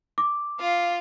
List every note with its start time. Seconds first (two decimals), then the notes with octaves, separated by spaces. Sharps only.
0.18 D6
0.60 F4 F5